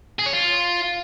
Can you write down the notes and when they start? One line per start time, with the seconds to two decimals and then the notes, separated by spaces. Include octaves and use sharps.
0.19 G#4
0.26 C#5
0.33 F4